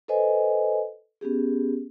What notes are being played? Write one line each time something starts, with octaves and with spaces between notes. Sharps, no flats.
A4 B4 C5 D#5 G#5
B3 C#4 G4 G#4